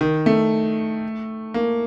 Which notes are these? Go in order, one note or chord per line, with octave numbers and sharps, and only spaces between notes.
D#3
A3
A#3